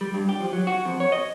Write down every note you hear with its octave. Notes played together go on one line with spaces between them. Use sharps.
G3
G2
G4
F3
F#3
F#4
F2
C#5
D#5